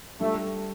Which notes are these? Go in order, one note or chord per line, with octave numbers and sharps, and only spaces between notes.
G3 A3 D4 F4 A4